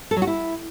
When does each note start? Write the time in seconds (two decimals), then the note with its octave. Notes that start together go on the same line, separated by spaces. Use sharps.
0.11 A4
0.16 F#3
0.22 F#4
0.27 E4